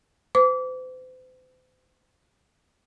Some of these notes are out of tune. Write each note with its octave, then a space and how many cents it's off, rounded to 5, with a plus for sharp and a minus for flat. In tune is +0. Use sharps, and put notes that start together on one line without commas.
C5 -40 D6 -30